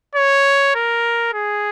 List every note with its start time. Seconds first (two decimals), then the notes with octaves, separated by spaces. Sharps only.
0.15 C#5
0.75 A#4
1.34 G#4